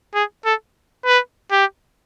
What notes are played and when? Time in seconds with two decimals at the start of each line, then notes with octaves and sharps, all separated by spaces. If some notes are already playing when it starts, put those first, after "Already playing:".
0.15 G#4
0.45 A4
1.06 B4
1.51 G4